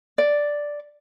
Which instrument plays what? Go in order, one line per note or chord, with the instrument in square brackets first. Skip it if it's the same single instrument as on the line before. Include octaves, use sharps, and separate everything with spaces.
[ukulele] D5